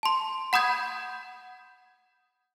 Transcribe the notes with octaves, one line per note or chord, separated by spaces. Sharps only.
A5 C6
F#5 B5 D#6 G6 G#6